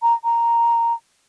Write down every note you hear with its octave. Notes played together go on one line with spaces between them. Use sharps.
A#5
A#5